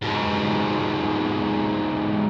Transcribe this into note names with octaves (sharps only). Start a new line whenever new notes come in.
G#2 B2